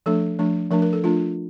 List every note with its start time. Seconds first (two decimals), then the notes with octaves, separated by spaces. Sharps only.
0.06 F3 A3 D4 A4
0.39 F3 A3 D4
0.71 F3 A3 D4 A#4
0.82 A#4
0.93 A4
1.03 F3 A3 D4 F4